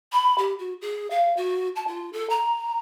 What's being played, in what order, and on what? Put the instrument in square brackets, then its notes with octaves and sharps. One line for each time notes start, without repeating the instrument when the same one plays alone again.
[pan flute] B5
G4
F#4
G#4
F5
F#4
A5
F4
A4
A#5